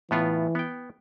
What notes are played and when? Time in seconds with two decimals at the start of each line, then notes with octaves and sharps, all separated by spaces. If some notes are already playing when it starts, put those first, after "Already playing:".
0.11 A2 E3 B3 F4
0.55 B3 G5